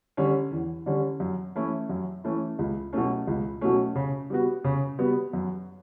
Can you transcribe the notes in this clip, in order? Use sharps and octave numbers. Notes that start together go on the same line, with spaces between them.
D3 G3 C#4
E2
D3 G3 C#4
F#2
E3 A3 C#4 E4
F#2
E3 A3 C#4 E4
C#2
B2 F#3 A3 C#4
C#2
B2 F#3 A3 C#4
C#3
G3 B3 F#4
C#3
G3 B3 F#4
F#2